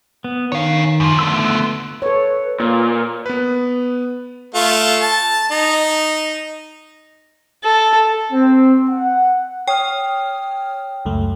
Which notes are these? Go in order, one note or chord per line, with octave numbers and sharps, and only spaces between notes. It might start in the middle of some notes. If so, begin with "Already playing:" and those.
B3
D#3 C#5 F5
F#2 F3
D3 F3 A3 B3 E6
A4 B4 C#5
A#2 F4
B3 B4
A3 F4
A5
D#4
A4
C4
F#5
C#5 G5 D#6 F6
C#2 F#2 A3